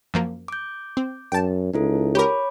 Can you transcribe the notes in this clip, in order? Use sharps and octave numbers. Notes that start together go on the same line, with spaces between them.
F#2 F3 A#3
D6 G6
C4
F#2 G5 A5
C#2 D#4 E4 A4
G4 A#4 C#5 B5 D6